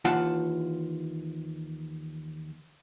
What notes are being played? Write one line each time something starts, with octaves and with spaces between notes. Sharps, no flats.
D#2 E3 F4 F#5 A5